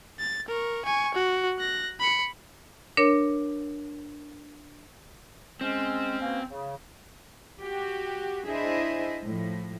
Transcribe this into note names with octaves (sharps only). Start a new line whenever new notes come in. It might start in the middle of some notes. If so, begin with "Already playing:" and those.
A6
A#4 C#6
G#5 C#6
F#4
F#6 A#6
B5 C#7
D4 A#4 C#5
G#3 C4 C#4
B2 A#3 C#4
C#3
F#4 G4
D4 E4 G#4 C5 D#5 E5
A2 F3